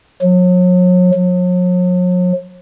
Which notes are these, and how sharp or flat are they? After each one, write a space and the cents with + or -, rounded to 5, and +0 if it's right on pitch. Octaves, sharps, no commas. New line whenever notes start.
F#3 -40
F#3 -45